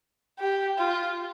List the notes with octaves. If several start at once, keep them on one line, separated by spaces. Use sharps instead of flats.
G4
F4